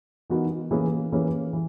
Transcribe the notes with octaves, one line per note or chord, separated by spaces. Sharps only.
E3 B3 D#4 F#4 A#4
E3 A#3 C#4 G#4 B4
E3 A#3 C#4 G#4 B4
E3